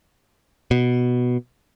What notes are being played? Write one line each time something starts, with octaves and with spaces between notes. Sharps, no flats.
B2